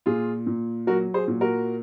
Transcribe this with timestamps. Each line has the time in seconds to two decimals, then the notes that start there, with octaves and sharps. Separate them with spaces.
0.06 A#2 F4 G#4
0.47 A#2
0.87 F#3 F#4 A#4
1.14 G#4 C5
1.28 A#2
1.41 F#4 A#4